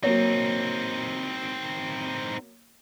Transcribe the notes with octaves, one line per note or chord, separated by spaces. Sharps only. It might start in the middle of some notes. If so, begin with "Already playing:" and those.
F#3 A#3 C4 D#4 C#5